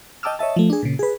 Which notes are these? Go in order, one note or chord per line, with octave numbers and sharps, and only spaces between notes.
D#5 G5 A5 D6 E6 F6
C#5 D#5 E5 A5
F3 A3
D4 G#4
A#2 C#3
G#4 B4